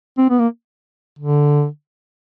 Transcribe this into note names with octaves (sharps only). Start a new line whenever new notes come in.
C4
B3
A#3
D3